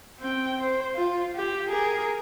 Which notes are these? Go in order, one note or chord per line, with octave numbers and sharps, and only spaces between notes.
C4 G5
C5
F4
G4
G#4 A#4